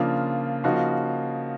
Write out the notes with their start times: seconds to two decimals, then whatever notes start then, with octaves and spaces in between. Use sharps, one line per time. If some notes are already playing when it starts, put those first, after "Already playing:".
Already playing: C#3 F3 A#3 D4 F4
0.64 C#3 F3 A#3 D#4 F#4